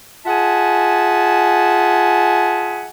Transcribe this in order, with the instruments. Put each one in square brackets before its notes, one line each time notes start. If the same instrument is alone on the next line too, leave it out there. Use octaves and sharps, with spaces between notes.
[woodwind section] F4 G#4 E5 F#5 G#5 A5